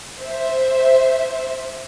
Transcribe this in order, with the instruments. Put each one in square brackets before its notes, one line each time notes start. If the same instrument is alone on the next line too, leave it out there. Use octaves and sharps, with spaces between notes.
[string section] C5 E5